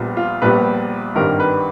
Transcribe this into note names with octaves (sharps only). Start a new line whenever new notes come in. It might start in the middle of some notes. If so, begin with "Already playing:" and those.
Already playing: A#1 A#2 G3 B3
F4
A#1 A#2 G3 B3 B4
G#1 G2 D#3 G3 A#4
B4